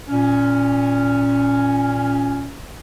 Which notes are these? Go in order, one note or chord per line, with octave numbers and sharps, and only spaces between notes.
A#2 C#4